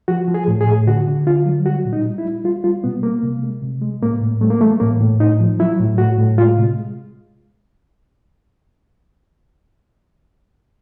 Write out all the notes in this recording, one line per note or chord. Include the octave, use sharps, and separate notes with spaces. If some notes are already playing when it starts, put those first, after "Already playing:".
F3 F#4
F3
G#4
A2
G#4
A2
D3 F#4
D3
D3 F4
F#3
G3 F#4
A#2
D#4
G3
E4
G3
G3 F4
G3 F4
B2 B3
G3 A#3
C3
G#3
C3
G#3
A2 A#3
A2
G3 A3
A#3
E3 A3
A2 A#3
A2
A2 D#4
F3
F#3 E4
A2
A2 F#4
A2
G#3 F4
C3